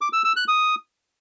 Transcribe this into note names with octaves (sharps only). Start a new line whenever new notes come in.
D6
E6
E6
F#6
D#6